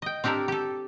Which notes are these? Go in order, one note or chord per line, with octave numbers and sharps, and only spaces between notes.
D#5 G5
C4 D4 G4 A4 A#4
G4 A4